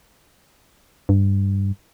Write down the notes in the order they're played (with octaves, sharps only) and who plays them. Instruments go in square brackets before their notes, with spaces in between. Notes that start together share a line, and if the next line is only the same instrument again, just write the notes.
[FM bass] G2